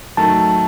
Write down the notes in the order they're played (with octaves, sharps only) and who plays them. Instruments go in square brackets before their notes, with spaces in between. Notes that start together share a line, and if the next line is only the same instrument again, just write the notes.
[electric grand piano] D#3 F#3 A3 [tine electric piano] A5